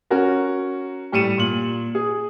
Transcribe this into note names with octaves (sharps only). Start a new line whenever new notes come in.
C#4 F#4 A#4
A2 G3 C#7 D#7 E7
A#2 F#7
G#4